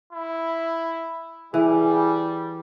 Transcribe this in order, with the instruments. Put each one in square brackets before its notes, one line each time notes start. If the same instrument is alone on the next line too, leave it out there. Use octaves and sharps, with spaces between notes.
[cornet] E4
[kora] E3 [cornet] G3 [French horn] G#4